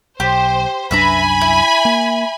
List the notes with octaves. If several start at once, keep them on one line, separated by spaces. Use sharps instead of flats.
B1 G4 C5
C2 F#2 D4 B4 E5 G#5 A#5 B5
E4
A#3